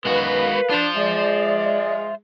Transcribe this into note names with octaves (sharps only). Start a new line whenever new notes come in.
F#2 D#3 G#3 B3 F#4 A#4 B4 F5
D4 F4 C5
G#3 D5 E5